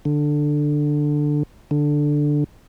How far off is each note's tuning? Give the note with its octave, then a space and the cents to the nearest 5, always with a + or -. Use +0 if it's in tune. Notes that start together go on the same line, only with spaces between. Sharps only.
D3 +10
D3 +5